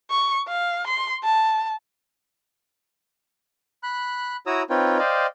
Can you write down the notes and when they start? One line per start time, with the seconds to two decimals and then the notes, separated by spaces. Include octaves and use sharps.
0.10 C#6
0.48 F5
0.87 C6
1.24 A5
3.83 B5 F#6
4.46 E4 F#4 C#5 A#5 D#6 E6
4.70 C4 D#4 F4 B4 C#5 G5
4.99 C5 D5 D#5 F5 G5